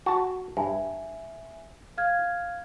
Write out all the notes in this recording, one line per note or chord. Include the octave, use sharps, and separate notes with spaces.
F#4 A5
G2 E5 G#5
F5 F6 G#6